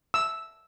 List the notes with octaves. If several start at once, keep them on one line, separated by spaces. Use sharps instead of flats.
E6